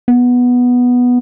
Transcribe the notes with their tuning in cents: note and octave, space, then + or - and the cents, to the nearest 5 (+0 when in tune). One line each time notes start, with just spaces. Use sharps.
B3 -5